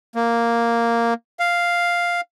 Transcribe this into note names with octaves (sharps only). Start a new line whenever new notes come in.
A#3
F5